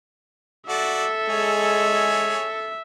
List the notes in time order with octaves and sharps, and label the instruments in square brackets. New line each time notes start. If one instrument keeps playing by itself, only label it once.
[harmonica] F#4 D5 [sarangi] A4 [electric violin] E5
[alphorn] G#3 [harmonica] G#4 C#5